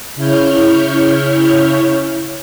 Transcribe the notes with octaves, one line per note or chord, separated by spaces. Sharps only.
C#3 E4 C#5 F6 G6